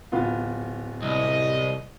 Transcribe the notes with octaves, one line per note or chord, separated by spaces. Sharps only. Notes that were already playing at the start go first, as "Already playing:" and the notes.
D1 B3 F4
C2 D#5